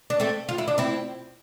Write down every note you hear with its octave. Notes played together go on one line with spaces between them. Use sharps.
D4
A3 C4
F4
E4
D4
C4 E4